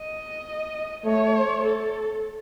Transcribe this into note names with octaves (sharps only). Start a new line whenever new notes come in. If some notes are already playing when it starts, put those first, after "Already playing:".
Already playing: D#5
A3 C#5
A4